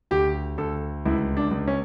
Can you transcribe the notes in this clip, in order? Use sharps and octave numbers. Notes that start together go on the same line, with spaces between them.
D2 G4
D2 A4
C#2 E4
D4
C#2
C#4